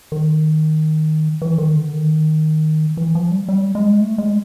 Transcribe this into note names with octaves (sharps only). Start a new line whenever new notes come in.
D#3
E3
D#3
D3
D#3
E3
F3
G3
G3
G#3
A3
G#3